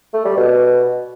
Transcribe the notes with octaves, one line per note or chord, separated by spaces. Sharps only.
A3
G3
B2